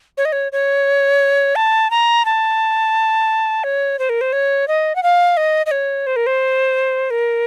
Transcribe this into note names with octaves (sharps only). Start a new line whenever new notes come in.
C#5
D#5
C#5
C#5
A5
A#5
A5
C#5
C5
A#4
C5
C#5
D#5
F#5
F5
D#5
D#5
C#5
C5
A#4
C5
A#4